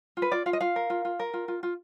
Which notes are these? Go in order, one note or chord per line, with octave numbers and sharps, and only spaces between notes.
F4
B4
F4 D5
F4 F5
D#5
F4 F5
A#4
F4
F4
A#4
F4
F4
F4